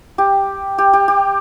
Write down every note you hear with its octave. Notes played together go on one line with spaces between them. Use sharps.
G4
G4
G4
G4